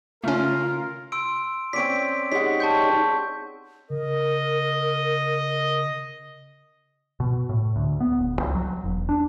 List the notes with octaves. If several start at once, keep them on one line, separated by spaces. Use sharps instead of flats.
C#3 A3 C#4 F4 A#4
C6 E6 D7
C4 C#4 D5 B6 D7
G#3 D#4 G4 C#5 F#5 B6
A5 C#6 G6
C#3 A#4 D#5
B2
A2
D2
B3
D1
C#2
F#3
E1
D4